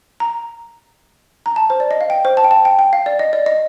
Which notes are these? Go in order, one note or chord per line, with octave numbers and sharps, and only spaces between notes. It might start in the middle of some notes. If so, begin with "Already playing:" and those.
A#5
A#5
A5
C5
D5
D#5
F5
G5
C5
A5
G5
A5
G5
G5
F5
D5
D#5
D5
D#5